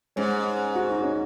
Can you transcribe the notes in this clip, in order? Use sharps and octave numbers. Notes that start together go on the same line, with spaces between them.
G#2 G#3 C#4
F#4
D#4
C#4